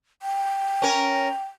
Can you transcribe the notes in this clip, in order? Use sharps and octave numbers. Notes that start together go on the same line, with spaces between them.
G5
C#4 A#4